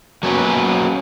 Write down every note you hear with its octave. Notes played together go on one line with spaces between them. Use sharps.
F#3 A#3 C#4 D4 F#4 B4